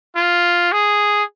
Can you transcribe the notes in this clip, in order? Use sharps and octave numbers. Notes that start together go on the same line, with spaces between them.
F4
G#4